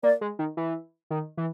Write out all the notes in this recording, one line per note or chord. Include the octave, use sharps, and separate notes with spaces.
A#3 D5
G#3
D#3
E3
D#3
E3